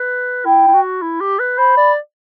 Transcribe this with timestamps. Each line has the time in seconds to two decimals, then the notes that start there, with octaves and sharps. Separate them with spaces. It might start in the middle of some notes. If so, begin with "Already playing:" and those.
Already playing: B4
0.45 E4 G5
0.68 E4
0.74 F#4
1.02 E4
1.21 G4
1.39 B4
1.58 C5 B5
1.77 D5